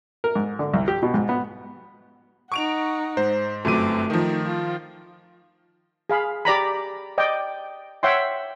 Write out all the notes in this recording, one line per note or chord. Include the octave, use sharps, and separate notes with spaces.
A#4
G#2
D3
C2
G4
B2
G#2
B3
D#4 F#5 C#6 D7 F7
G#2 C5
G1 F#2 A3 C4 D6 D#7
D#3 F3 D#4
F4
G#4 F5 B5
G4 D5 A#5 B5
D5 D#5 G5
C#5 E5 F#5 G5 C6